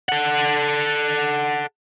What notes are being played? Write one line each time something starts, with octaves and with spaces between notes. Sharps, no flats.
A4 F#5